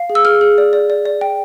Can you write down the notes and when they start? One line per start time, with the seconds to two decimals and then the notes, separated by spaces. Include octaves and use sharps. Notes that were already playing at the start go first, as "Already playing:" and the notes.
Already playing: F5
0.10 G#4
0.15 E6
0.25 G#4 F6
0.41 G#4
0.58 D5
0.73 D5
0.90 D5
1.06 D5
1.21 G5